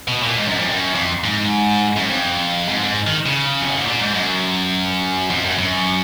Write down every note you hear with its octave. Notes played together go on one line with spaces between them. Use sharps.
B2
A#2
G#2
F#2
F2
F#2
F2
G#2
F#2
F2
G#2
G#2
D#3
C#3
F2
F#2
G#2
A#2
G#2
F#2
F2
F#2
F#2